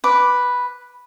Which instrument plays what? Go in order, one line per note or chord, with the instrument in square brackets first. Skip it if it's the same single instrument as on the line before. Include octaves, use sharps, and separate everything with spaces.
[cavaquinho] B4 D6